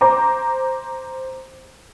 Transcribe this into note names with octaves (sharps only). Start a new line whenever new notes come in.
C5 A#5 D6